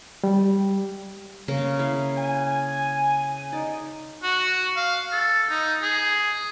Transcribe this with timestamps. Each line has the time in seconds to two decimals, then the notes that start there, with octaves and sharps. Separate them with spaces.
0.24 G3
1.48 C#3 A#3 A#4
1.79 E4 F5
2.17 G#5
3.53 D#4 D5
4.23 F#4
4.76 F5
5.12 A4
5.50 D#4
5.82 G#4